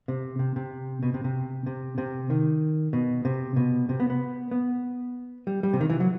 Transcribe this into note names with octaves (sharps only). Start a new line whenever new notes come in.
C3
C3
C3
B2
C3
C3
C3
C3
D#3
B2
C3
B2
C3
B3
B3
B3
G3
G3
C3
D#3
E3
F#3